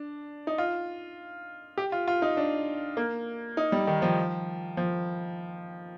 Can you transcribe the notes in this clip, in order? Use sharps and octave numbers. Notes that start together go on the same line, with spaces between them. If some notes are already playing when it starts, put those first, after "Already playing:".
Already playing: D4
D#4
F4
G4
F4
F4
D#4
D4
A#3
D#4
G3
D#3
F3
F3